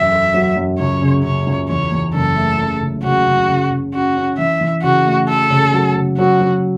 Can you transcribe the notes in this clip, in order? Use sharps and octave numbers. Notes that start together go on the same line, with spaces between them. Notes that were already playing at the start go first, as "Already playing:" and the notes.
Already playing: E1 F#2 E5
A4
F#3
F#2
C#2 C#5
C#3
C#3 C#5
C#2
E2 C#5
E2
F#1 A4
A3
C#3
C#2
C#3 F#4
C#3
C#3
C#3
C#4 F#4
C#4
E3 E5
E3
C#3 F#4
A3
F#4 A4
C#3
F#3
C#3
F#3 F#4
F#3